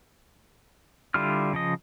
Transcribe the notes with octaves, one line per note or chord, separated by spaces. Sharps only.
D3 G3 E4 F4 F6
C#3 F3 D#5